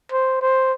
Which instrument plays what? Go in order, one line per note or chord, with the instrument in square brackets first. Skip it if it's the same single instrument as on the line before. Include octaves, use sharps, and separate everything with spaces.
[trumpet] C5
C5